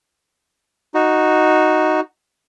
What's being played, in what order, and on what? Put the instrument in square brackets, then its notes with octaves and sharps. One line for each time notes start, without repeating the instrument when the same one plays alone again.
[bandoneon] D#4 F#4